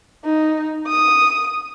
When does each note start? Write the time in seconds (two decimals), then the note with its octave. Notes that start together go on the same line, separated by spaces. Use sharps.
0.25 D#4
0.87 D#6